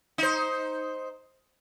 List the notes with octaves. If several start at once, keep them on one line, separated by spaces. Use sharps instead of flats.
D#4 C5